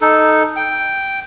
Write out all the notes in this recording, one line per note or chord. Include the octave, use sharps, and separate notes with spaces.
D#4 A4
G5